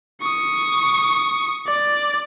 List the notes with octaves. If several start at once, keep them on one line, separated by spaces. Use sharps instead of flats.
C#6 D#6
D5 D6